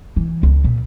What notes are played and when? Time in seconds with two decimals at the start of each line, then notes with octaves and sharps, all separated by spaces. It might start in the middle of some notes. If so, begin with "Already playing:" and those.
0.16 E3
0.43 C#2
0.64 A#2